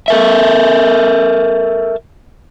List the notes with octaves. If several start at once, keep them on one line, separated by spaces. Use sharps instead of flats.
A4 A#4 E5